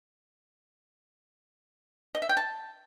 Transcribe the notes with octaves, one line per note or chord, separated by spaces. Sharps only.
D#5
E5
G5
A5